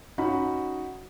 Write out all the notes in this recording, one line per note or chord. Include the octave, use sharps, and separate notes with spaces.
C#4 D#4 F#4 B5